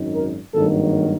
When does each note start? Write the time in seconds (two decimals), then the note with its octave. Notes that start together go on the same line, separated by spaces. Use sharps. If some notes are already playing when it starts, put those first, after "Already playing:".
Already playing: G#1 F#2 D#3
0.15 A#4
0.54 G#1 G2 D#3 F#3 A#3 A4